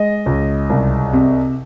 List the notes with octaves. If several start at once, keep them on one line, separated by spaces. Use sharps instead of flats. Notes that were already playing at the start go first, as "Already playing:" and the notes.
Already playing: G#3 D#5
C#2
C2
C3